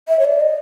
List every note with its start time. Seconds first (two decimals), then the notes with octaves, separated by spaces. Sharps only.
0.08 E5
0.19 C#5
0.25 D5
0.40 D#5